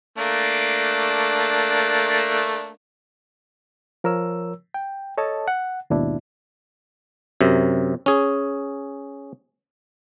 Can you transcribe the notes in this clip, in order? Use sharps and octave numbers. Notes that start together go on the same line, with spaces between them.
A3 A#3 D4
F3 A#4 C#5 E6
G5
A4 C#5 D#5 A5
F#5
D#2 G#2 B2 D4 E4
F#2 C3
C#4 G#4